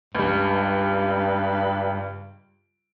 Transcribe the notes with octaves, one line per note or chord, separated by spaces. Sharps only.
C#2 G2 G3